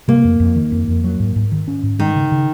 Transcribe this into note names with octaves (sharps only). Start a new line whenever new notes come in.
C3 A#3
F2
F2
D#3
F2
F2
F#3
G#2
G#2
D#3
C#4
G#2
D#3 G#3
C#3
C#3